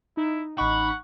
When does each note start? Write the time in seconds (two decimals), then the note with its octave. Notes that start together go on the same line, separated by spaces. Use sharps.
0.17 D#4 E4
0.58 A1 D#4 F#5 B5 C#6